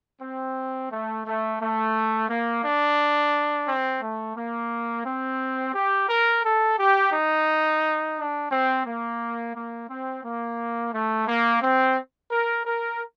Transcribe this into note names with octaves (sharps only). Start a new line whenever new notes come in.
C4
A3
A3
A3
A#3
D4
C4
A3
A#3
C4
G4
A#4
A4
G4
D#4
D4
C4
A#3
A#3
C4
A#3
A3
A#3
C4
A#4
A#4